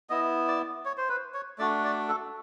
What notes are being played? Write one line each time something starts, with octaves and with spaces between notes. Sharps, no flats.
B3 E4 D#5
D5
C#5
C5
B4
C#5
A3 D4 F#4 D5
D5
A4